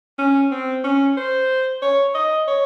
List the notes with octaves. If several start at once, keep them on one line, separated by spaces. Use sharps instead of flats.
C#4
C4
C#4
C5
C#5
D#5
C#5